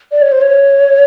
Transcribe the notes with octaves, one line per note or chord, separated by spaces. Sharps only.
D5
C#5
C5
C#5